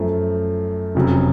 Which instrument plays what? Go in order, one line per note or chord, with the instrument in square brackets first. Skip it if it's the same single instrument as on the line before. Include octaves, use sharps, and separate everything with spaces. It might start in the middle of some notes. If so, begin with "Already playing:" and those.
Already playing: [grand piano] F#2 F3 A3
F1 F2 C#3 F#3